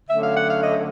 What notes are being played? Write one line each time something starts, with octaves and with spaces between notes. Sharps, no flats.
D3 F#3 A3 C#4 E5
F5
F#5
F5
D#5